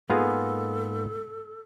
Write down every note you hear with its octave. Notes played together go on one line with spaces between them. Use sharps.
G#2 A#3 B3 D#4 F4 G#4 A4